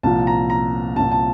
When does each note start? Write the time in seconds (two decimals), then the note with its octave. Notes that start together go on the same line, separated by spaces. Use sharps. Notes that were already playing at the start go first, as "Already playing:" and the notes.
0.03 C2 A#2 F3 A5
0.27 A#5
0.50 A#5
0.96 C2 A#2 F3 A5
1.12 A5